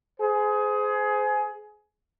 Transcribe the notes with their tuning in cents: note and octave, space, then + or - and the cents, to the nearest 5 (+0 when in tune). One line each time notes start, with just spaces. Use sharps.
G#4 +20 C5 -30